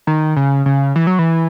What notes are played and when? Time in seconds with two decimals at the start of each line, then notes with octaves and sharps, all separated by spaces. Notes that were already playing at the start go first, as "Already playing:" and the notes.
0.07 D#3
0.36 C#3
0.66 C#3
0.96 E3
1.07 F#3
1.19 E3